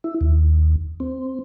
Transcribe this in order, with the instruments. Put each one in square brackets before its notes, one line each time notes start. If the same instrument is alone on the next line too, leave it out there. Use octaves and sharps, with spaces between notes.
[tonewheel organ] E4
D#2
C4